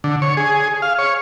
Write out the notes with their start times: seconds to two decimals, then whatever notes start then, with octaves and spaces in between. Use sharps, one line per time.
0.04 D3
0.22 C#5
0.37 G#4
0.82 F5
0.99 C#5